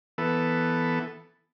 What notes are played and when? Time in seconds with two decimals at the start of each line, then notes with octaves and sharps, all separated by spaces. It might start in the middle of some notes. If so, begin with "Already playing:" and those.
0.18 E3 B3 A4